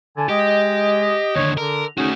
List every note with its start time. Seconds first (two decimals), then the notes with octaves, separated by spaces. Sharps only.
0.17 D3 G#5 A5
0.29 G#3 G4 D#5
1.36 D#2 D3 C#5
1.57 D3 A#4
1.98 A3 C#4 D#4 F#4 G#4